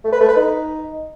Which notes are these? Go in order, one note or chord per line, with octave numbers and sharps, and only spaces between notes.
A3
B4
A3
B4
D#4